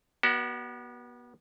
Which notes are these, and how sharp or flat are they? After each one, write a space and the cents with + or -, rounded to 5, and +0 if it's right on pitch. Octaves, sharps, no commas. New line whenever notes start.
B3 -35 F#4 +30 D5 +10